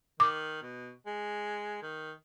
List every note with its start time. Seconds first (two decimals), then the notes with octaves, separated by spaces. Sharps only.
0.20 D#3 D6
0.62 B2
1.06 G#3
1.83 D#3